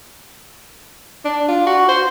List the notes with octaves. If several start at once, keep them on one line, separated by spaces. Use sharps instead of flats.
D4
F4
F#4
C5